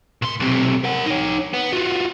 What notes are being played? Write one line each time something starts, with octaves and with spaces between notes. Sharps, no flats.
A#2 C6
B1 C3
A#4 F#5
D#4 C#5
B3
F4 F#4